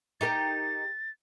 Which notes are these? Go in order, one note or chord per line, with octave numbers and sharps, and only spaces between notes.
D#4 G4 A#4 A6